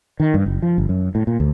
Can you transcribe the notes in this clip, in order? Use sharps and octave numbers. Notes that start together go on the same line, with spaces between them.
D#3
G2
F#1
F3
G1
F#2
A2
A#2
D2